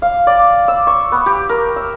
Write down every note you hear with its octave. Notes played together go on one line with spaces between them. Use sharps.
F5
D5
E6
C#6
B3
G4
A#4
E6